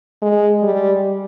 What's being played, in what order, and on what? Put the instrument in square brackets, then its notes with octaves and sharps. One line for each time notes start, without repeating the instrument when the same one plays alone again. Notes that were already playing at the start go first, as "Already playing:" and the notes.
[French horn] G#3
G3